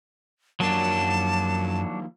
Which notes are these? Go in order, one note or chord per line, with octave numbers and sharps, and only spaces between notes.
F#2 D#3 F3 F#3 A#3 D4 A5